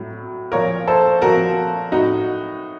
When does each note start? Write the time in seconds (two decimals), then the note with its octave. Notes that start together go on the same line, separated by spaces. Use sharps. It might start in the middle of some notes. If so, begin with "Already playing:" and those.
Already playing: A2 F#3
0.52 A#2 F3 A#4 C#5
0.87 A4 C5
1.21 A#2 F3 F#4 A#4
1.92 A2 F#3 D#4 F#4